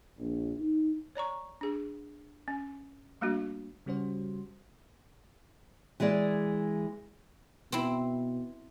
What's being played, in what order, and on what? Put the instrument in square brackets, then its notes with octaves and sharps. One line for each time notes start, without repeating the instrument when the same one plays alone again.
[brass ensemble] A#1
D#4
[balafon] C#5 D5 A#5 C#6
D4 G#4
C#4
G3 A3 A#3 D4 F#4
[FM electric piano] C#3 G3 C#4 F#4 C5
[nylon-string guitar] E3 G#3 G#4 D5
[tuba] B2 [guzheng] C4 E4